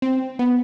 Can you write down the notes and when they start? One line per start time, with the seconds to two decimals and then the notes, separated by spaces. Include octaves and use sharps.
0.02 C4
0.39 B3